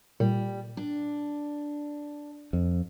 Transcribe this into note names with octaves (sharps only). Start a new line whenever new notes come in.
A#2 G3
D4
F2